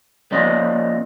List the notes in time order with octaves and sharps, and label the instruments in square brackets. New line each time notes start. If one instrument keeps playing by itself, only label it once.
[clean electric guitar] A#2 F3 C#4 D5 D#5